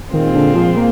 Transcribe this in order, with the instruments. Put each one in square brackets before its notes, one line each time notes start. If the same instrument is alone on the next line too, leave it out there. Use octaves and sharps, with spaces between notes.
[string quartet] A#2 G#3 C4 F4 [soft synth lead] D#3
[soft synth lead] D3
F3
A#3